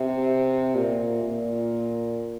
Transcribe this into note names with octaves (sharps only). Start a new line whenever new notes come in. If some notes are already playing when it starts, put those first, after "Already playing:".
Already playing: C3
A#2
A#2